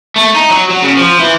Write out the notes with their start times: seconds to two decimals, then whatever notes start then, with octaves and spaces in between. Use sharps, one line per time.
0.16 A3
0.34 D#4
0.51 F#3
0.70 F#3
0.82 C#3
0.97 F3
1.19 E3